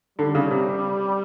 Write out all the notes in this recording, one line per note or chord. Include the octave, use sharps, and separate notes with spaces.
D3 G3
C#3
C3